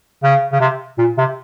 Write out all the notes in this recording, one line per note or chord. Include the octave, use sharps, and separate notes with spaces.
C#3
C#3
C3
A#2
C3